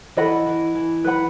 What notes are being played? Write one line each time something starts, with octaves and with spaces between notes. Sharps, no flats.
E3 A4 D#5 F#5 B5
E3
E3
B4 F#5 B5